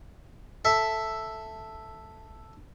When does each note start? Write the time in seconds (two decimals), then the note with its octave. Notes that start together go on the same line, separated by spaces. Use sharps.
0.65 A4 E5